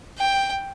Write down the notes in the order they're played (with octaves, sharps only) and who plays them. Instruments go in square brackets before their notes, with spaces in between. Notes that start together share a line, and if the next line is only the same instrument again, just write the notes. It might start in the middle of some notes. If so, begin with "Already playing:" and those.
[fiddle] G5